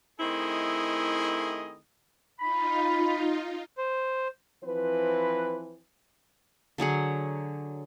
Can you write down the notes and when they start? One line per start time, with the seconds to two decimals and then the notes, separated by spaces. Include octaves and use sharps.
0.20 D#3 A3 C4 E4 G#4 D#5
2.39 D#4 F4 B5
3.78 C5
4.63 E3 F3 C4 B4
6.78 D3 F#3 G#4 F#5